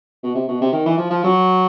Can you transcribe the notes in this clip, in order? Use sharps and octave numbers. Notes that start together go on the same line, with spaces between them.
B2
C3
B2
C3
D#3
E3
F3
F3
F#3